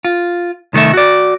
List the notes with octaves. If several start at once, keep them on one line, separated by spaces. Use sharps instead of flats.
F4
C2 D#3 A3 A4 E5
F#4 D5